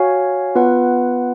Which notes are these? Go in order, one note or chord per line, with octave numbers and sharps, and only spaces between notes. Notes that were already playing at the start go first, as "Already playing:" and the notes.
Already playing: F#4 C#5 F5 G#5
B3 F4 B4 F#5